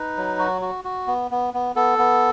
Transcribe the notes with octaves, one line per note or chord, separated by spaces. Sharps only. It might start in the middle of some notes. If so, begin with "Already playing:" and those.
Already playing: D#4 B4
F#3
F#4
F#4
F#4
B3
B3
B3
B3 A4
B3